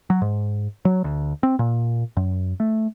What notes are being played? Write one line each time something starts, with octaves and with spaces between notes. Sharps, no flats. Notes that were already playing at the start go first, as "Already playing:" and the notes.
F#3
G#2
F#3
D2
C4
A#2
F#2
A3